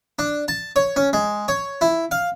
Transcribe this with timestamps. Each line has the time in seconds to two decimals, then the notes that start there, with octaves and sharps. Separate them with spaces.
0.19 D4
0.48 A5
0.76 C#5
0.96 C#4
1.13 G#3
1.48 C#5
1.81 E4
2.11 F5